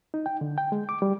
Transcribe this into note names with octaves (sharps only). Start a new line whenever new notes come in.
D#4
G5
D3
G5
G#3
D6
G3